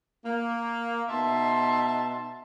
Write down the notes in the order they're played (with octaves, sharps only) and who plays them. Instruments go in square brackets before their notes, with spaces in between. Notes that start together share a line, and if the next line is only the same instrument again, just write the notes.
[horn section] A#3
B2 D#4 E5 A5 C6